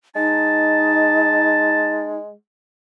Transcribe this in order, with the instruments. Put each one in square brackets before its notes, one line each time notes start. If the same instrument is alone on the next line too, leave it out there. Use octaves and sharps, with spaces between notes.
[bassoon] G#3 [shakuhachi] D#4 [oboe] A5